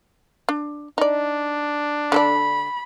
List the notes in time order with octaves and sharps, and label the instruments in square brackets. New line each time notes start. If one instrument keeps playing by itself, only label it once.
[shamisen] D4
[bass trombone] D4 [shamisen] D#4 D5
[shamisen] D3 A4 D5 [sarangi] B5